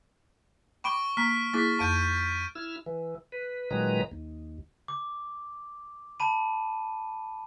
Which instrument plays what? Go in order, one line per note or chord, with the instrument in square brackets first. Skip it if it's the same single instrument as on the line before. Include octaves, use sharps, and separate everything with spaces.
[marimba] G5 B5 D6 [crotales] C#6 D7 G7
[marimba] A#3 A#5 [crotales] F6 B6
[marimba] A#3 E4 G#4 [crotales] A6 B6
[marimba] F2 A5 [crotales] G6 D7 D#7
[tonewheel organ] E4 E6 F6
E3
B4
A#2 D#3 F#3 G#3 B4 A#5
D#2
[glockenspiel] D6
A5 B5 D#7